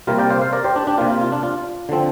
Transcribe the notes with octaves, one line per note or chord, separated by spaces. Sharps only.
C3 G3 A#3 F4 A#4
D5 G5
C5 F5
C5 F5
A#4 D5
G4 C5
D4
D4 G4
C3 A#3 F4
F4
F4
D4
F4
D3 F3 C4